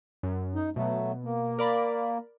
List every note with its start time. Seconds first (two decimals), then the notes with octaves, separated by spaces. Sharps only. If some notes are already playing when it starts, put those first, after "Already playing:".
0.23 F#2
0.55 D#4
0.76 B2 F#3 A3
1.24 A#3
1.59 A#4 D5 B5